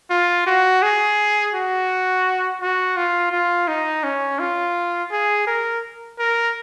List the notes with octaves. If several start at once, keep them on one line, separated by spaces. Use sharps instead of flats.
F4
F#4
G#4
F#4
F#4
F4
F4
D#4
C#4
F4
G#4
A#4
A#4